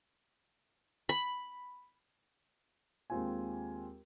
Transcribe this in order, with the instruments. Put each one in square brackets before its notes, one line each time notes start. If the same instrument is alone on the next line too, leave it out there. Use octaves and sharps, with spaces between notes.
[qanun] B5
[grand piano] D#2 G#3 C4 F4 G#5